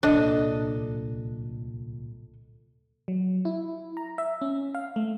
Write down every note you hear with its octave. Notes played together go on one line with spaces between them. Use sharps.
D1 C2 A#2 D4 A4 D#5
F#3
E4
A#5
E5
C#4
F5
A3